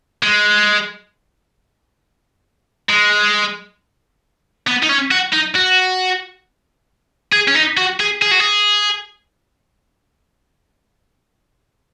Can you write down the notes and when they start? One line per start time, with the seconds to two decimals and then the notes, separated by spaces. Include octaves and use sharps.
0.23 G#3
2.89 G#3
4.67 B3
4.83 D#4
4.89 C#4
5.11 F#4
5.33 D#4
5.56 F#4
7.33 G#4
7.48 C#4
7.55 D#4
7.77 F#4
8.00 G#4
8.22 G#4
8.31 F#4
8.40 G#4